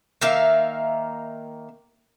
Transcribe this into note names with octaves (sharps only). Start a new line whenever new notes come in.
D#3 A#3 E5 F5